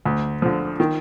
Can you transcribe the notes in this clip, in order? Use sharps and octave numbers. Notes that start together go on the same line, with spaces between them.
D2
D3 F3
D#3